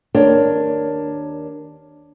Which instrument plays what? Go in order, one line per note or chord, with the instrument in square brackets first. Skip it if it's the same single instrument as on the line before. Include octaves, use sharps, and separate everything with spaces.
[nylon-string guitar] D#2 D4 A#4 C5 C#5 G5